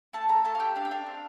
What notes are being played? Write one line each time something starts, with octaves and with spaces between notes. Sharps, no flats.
A3 A5
A4 A#5
A3 A5
F5
G4 G5
D4 F5
G5
D4 F5
C4